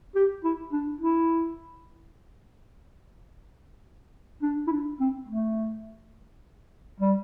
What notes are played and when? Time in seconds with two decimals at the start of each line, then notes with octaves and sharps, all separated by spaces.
0.15 G4
0.44 E4
0.72 D4
1.00 E4
4.42 D4
4.67 E4
4.72 D4
5.00 C4
5.28 A3
7.00 G3